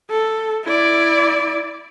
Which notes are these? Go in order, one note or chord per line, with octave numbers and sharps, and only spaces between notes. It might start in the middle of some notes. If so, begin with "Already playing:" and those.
A4
E4 D5